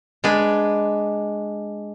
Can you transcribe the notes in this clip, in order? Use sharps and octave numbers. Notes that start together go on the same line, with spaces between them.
G#3 D4 B4